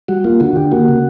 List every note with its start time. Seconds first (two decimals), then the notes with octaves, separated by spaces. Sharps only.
0.08 G3 F#4
0.24 A#3 F4
0.40 D3 F#4
0.56 D3 G4
0.72 A#3 F#4
0.88 C#3